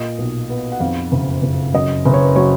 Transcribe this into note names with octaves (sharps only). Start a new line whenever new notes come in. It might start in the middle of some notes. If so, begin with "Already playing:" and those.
Already playing: A#2 D#5
B1
B3
F#5
F2 F5
F#1
F#1
F#2 D#5
F#1 B4
C#5
B4
F#3 C#5